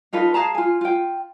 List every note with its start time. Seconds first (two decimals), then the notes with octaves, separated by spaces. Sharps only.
0.13 D#4 F4 A4 B4
0.34 G#4 F5 A5 A#5
0.55 F4 G#5
0.81 F4 G5